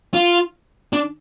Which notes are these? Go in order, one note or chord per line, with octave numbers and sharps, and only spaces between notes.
F4
D4